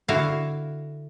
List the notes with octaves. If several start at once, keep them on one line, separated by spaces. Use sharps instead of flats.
D3 E4 F#4 E5 F5